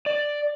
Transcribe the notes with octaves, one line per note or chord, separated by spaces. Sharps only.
D5